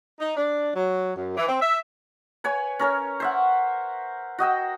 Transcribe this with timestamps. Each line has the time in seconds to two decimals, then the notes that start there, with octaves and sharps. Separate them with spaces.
0.20 D#4
0.37 D4
0.76 F#3
1.16 F#2
1.37 E3
1.49 C4
1.62 E5
2.44 B4 C#5 G#5
2.79 C#4 A#4 C#5
3.20 C5 E5 F#5
4.38 F#4 D#5 G5 E6